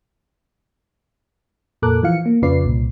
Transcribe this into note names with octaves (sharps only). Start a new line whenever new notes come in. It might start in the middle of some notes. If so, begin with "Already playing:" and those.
F2 A#2 A4 A#4 D6 F#6
E3 F3 F4 F5 C#7
A#3
F2 C#3 F4 B4 D5 C7
C2 A#2